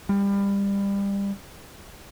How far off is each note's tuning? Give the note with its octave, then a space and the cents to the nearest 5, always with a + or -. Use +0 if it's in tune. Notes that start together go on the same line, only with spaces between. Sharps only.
G3 +25